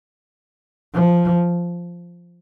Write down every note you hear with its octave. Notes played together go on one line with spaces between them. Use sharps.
F3